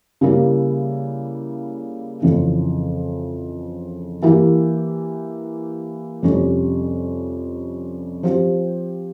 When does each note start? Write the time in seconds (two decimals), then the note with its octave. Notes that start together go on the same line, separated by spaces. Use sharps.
0.21 C#3 G3 A#3 E4
2.22 F2 C#3 E3
4.23 E3 A#3 E4 G4
6.23 F2 C3 G3 C#4
8.23 F3 C4 G4